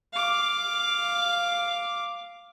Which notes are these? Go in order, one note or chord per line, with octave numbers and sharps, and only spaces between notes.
F5 D6